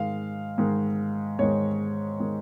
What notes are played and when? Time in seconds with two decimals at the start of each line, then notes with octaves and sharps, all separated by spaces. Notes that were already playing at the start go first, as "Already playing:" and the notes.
Already playing: G#2 D#3 G#3 F5
0.58 G#2 D#3 G#3
1.39 G#2 D#3 G#3 C#5
2.20 D#3 G#3